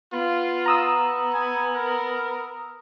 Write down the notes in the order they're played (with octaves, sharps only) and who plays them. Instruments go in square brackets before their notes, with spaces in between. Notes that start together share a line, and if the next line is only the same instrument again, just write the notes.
[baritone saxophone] B3 [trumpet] F4
[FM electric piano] A#5 D#6 E6
[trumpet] G#5
A#4